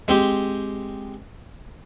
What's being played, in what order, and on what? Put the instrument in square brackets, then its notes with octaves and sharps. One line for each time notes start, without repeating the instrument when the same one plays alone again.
[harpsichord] G#3 C4 G4